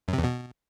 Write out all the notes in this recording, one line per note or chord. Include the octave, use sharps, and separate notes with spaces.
F#2
C3
E2
B2